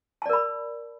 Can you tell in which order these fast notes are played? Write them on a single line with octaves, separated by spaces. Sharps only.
A5 D5 A#4 B5